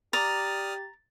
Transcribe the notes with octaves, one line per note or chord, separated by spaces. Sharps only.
G4 D5 A#5 D6 D#6 F6 A6